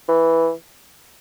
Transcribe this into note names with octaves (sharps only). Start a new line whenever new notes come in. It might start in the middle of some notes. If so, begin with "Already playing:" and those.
E3